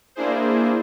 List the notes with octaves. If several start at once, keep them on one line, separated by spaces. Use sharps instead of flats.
A#3 D4 E4 G#4 C5